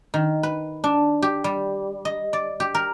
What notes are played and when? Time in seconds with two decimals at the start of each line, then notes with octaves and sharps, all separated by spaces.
0.14 D#3
0.43 B4
0.84 D4
1.22 G4
1.44 G3
2.05 D#5
2.33 D5
2.60 G4
2.75 A#4